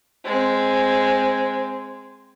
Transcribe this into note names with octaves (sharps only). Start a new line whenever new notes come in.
G#3 C4